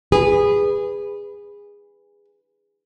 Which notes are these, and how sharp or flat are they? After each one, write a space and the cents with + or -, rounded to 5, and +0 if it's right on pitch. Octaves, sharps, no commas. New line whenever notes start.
G#4 -20 B4 +0